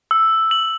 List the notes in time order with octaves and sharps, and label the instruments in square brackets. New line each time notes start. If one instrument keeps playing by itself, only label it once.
[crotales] E6
F#7